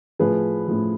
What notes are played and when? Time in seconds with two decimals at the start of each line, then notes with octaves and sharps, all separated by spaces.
0.19 A2 F3 G#4 B4
0.68 A2 F3